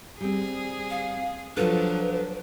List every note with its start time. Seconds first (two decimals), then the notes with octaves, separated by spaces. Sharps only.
0.21 G3 C4 G#4
0.90 F5
1.57 F3 F#3 D4 F4 A4 B4